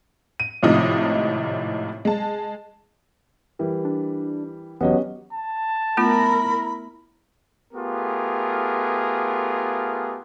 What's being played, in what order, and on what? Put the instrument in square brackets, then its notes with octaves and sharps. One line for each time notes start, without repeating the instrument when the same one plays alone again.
[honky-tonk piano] D#7
G#1 A2 C3 F3 D#4 D#6
G#3 A5
[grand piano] E3 G3 A#4
[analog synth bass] D4
[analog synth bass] E1 [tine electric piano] F#3 B3 [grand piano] C#4 G4 D#5
[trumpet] A5
[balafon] A3 B3 F4 [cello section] E4 A#4 [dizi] B5
[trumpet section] A3 B3 F4 G4 G#4 A#4